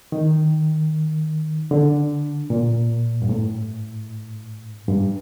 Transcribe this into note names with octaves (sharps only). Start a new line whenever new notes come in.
D#3
D3
A#2
G2
A2
G2